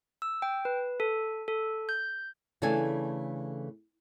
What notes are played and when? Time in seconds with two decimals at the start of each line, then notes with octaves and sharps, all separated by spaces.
0.22 E6
0.42 G5
0.65 B4
1.00 A4
1.48 A4
1.89 G6
2.62 C#3 E3 A3 D4 A4 G#5